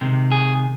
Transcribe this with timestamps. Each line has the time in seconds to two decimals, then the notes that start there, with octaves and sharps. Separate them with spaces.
0.01 C3 D#3 G#3
0.32 G#4